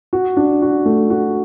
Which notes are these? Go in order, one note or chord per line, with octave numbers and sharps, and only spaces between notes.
F#4
D4
F#4
A3
F#4